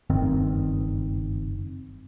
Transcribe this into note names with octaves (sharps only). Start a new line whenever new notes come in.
F#1 G2 D#3 C4